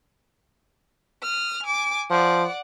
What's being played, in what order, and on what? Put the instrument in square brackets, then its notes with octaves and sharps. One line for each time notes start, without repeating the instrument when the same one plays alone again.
[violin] D#6 F6
G#5 D6
[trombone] F3 [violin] D5 F#5